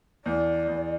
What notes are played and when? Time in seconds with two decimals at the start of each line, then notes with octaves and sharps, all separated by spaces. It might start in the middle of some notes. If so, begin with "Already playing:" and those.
0.25 E2 D5
0.68 E2